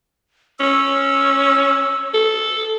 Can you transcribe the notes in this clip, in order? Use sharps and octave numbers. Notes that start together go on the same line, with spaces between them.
C#4 E6
A4